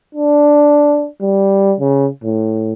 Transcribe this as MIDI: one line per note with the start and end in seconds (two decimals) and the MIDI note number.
0.15 1.08 62
1.21 1.75 55
1.80 2.08 49
2.24 2.73 45